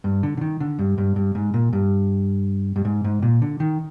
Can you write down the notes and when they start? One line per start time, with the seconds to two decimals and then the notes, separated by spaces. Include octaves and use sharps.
0.04 G2
0.23 D3
0.37 D3
0.41 D#3
0.60 D3
0.79 G2
0.98 G2
1.16 G2
1.35 G#2
1.54 A#2
1.73 G2
2.76 G2
2.85 G#2
3.04 G#2
3.22 A#2
3.42 D3
3.60 D#3